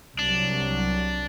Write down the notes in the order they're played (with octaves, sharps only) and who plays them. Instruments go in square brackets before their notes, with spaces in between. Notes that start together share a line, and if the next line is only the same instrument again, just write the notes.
[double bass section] C2 F#3 [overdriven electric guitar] D4